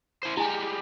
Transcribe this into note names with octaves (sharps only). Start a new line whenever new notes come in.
E4 C5
G3 G#3 E4 G#5